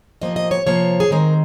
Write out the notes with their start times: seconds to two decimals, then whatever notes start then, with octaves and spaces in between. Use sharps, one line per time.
0.22 C3 F3 A#3 D#5
0.36 D#5
0.51 C#5
0.66 C3 F3 A#3 C#5
1.00 G#4
1.11 D#3 G#3 C4 A#4